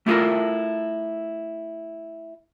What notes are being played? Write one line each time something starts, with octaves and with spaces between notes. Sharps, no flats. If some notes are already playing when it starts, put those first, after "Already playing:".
A3 E4 F4 A4 A#4